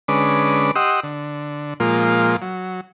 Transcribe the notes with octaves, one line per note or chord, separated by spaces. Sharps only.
D3 G#3 C#4 B4 D6
G4 D#5 F#5 C6 D#6 E6
D3
A#2 F3 G#3 A#3 F4
F#3